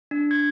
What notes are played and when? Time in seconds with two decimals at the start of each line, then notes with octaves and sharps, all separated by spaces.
0.11 D4
0.31 G#6